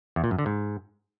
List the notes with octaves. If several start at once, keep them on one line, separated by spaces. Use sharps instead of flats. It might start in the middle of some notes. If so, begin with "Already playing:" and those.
E2
A#2
F#2
D3
G#2